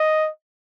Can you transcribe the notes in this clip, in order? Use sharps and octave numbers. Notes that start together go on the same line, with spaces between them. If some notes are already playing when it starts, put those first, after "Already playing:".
Already playing: D#5